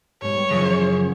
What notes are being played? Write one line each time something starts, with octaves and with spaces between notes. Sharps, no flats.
G#2 B2 G3 C#5
F#2 C#3 E3 F3 G#4